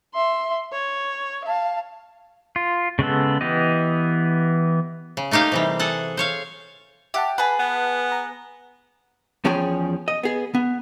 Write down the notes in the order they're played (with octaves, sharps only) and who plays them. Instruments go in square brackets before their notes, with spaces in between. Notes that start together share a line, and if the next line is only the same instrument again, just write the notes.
[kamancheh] E5 C6
C#5
F5 A5
[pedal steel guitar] F4
C#3 G#3 B3 A4
E3 B3 G4 D#5
[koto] C#3
A3 A#3 D#4 G4 F5
C3 E3 G3
G#4 A4 F#5
C5 C#5 F5
[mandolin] G4 [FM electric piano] E5 F#5 A5
[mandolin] G#4 B4 [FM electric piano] F#5 A5
[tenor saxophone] B3
[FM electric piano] A#5
[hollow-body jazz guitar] E2 F3 C#4 G#4 C#5 G5
D#5
B3 G#4
B3